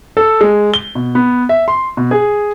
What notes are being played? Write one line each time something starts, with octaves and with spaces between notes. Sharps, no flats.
A4
G#3
G7
B2
B3
E5
C6
B2
G#4